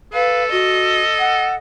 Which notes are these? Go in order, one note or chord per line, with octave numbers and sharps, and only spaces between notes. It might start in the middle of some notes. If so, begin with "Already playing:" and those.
A4 B4 F5
F#4 D#5
F#5